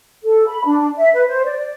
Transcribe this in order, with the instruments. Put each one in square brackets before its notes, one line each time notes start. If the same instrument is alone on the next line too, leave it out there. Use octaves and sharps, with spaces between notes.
[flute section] A4
B5
D4
E5
B4
C5
D5